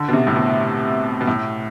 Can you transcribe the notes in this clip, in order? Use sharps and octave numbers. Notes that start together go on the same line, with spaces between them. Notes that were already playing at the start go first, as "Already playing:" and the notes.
Already playing: D3
B2
C3
A2
B2
B2
A2